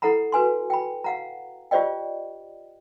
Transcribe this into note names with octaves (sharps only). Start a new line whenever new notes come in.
E4 A4 F#5 A#5 B5
F#4 B4 G#5 C6
G5 B5
F5 F#5 A#5
F4 G4 C5 D5 D#5 G5